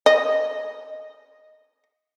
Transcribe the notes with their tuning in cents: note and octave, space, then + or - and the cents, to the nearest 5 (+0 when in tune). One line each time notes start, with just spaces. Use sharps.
D#5 +5